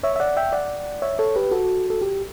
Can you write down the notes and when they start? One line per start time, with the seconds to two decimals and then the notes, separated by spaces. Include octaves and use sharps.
0.03 C#5 E5
0.16 E5
0.20 D5 F#5
0.37 E5 G5
0.52 D5 F#5
1.02 C#5 E5
1.19 A4 C#5
1.36 G4 B4
1.51 F#4 A4
1.90 A4
2.01 G4